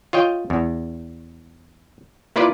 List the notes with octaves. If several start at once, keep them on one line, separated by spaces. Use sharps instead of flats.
F4 C#5 D#5 G5
E2
A#3 E4 F4 B4 D5